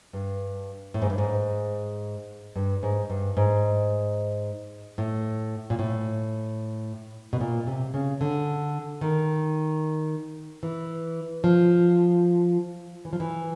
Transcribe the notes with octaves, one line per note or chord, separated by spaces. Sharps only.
G2
A2
G#2
G2
G#2
G2
G#2
G2
G#2
A2
A#2
A2
B2
A#2
C3
C#3
D3
D#3
E3
F3
E3
F3
E3